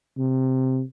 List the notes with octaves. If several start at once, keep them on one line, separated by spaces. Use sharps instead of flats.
C3